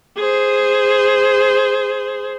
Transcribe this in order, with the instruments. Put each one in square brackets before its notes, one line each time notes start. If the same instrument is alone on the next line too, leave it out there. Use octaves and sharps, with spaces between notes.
[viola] G#4 C5